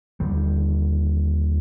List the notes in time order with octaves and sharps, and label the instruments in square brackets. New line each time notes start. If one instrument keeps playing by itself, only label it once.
[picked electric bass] D#2 D3 G3